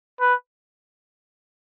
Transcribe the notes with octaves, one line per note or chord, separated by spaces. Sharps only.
B4